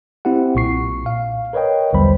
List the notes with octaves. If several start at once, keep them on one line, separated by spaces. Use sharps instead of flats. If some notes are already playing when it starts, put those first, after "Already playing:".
C4 E4 G4 F#5
B1 A#2 C#6 C7
F5
A#4 B4 C#5 D#5 G5
B1 E2 D3 G3 C5 B5